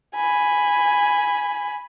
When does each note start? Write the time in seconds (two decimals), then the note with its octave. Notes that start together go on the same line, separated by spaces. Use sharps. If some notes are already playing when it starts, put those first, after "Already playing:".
0.16 G#5 B5